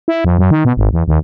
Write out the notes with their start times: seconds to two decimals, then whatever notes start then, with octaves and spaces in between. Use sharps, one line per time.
0.08 E4
0.24 F2
0.38 F#2
0.51 D#3
0.65 B2
0.77 G#1
0.93 E2
1.08 D#2